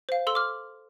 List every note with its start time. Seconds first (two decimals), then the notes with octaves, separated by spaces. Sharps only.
0.09 C5 F5
0.27 A4 C6 E6
0.35 D6 F6